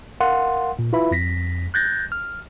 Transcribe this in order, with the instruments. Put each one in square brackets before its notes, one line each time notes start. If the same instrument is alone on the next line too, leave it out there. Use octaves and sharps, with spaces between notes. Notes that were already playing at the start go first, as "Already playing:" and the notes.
[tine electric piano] A#4 F5 F#5 C6
A#2
E4 F4 B4 E5 B5
F2 A#6 B6
F#6 G6 A6 A#6
F6